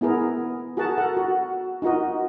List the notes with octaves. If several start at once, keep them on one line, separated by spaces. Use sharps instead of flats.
B3 E4 G#4 A#4
F#4 G#4 A#4 F#5 A5
A4 A#4 F#5
F#4
D#4 F4 F#4 A#4 D#5